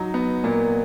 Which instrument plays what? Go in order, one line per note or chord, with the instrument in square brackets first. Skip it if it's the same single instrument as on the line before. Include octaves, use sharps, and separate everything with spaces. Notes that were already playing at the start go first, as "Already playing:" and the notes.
Already playing: [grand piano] F#3 D#4
B3
A#2